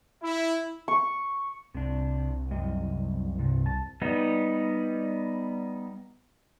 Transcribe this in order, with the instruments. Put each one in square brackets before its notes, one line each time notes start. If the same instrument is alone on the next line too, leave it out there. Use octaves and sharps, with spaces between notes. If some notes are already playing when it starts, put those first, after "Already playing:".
[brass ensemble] E4
[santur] C#6
[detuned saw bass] C2 [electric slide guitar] C3 D4
[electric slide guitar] F#2 G3 D#5
G2 C3
A5
[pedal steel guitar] G3 B3 D#4